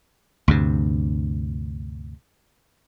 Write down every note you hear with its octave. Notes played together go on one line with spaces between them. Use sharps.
D2 G2 C3